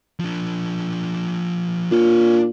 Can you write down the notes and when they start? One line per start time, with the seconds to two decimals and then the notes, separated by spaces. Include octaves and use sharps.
0.20 F3 D4
1.92 A#2 D4 C#5